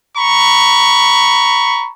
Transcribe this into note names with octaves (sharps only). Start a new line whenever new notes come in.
A#5 B5 C#6